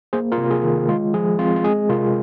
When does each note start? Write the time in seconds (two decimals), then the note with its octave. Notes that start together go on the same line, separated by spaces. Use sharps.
0.13 A#3 G#4 C5
0.32 F4 A#4
0.38 C3
0.51 G#4
0.63 D#3
0.88 G#3 F4
1.14 F3 G#4
1.39 C4 F4
1.56 F4
1.64 G#3 G#4
1.89 C3 F4 A#4